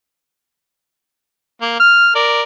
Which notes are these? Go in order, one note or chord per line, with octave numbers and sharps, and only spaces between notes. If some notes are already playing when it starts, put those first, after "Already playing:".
A#3
F6
A#4 D5